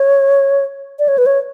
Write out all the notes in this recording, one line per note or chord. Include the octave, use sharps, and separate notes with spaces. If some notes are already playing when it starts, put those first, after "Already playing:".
Already playing: C#5
D5
C#5
B4
C#5